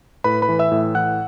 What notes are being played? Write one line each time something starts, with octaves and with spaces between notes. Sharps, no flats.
A2 B4 B5
B4 B5
E3
E5 E6
A2
E3 F#5 F#6